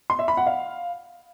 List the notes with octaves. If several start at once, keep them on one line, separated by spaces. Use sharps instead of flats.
C6
E5
B5
F#5
F5